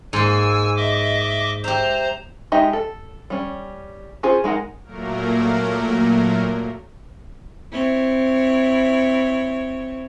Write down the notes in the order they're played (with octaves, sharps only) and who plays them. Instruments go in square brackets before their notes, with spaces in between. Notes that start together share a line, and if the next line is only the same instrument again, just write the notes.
[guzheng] G#2 A#3 [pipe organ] G#5 E6
[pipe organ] D#5 E5 D6
[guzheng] G4 E5 [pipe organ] C5 A#5
[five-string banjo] G#3 D#4 G4 D#5 E5
A4
G3 C#4
C#4 F4 G#4 C5
G#3 D#4 A#4 F#5
[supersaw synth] A#2 F#3 A3 A#3 A#4
[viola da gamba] C4 E4 C#5